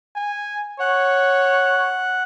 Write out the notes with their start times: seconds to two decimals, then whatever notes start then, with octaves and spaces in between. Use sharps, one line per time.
0.16 G#5
0.80 C#5 F#5